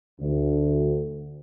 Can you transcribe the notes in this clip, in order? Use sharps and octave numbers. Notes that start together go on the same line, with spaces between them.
D2